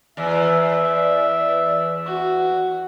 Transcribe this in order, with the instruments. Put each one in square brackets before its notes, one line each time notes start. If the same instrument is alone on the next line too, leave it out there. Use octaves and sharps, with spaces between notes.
[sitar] E2 [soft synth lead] D5 [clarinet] E5
[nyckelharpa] F#4